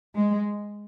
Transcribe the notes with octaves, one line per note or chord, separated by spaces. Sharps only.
G#3